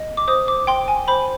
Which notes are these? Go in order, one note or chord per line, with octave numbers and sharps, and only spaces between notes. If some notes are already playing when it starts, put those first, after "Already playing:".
Already playing: D#5
D6
C5 D#6
D6
G5 C6
G#5
C5 B5